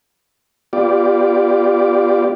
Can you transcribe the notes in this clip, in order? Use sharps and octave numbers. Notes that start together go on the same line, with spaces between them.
B3 F4 G4 D5